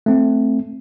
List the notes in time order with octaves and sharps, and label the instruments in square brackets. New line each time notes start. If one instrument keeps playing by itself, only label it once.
[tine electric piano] A3 C4